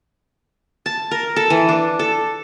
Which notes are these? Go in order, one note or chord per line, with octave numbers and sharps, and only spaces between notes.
A5
A#4
A4
E3
D4
A4